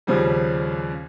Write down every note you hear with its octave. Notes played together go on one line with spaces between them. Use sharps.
D#2 C#3 F3 G3